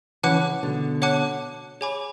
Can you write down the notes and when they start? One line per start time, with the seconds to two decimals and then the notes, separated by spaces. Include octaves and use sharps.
0.23 C#3 E3 C#5 F#5 A5 D6 F#6
0.63 B2 D3
1.02 C#5 F#5 A5 D6 F#6
1.81 G#4 C#5 G#5 B5 D6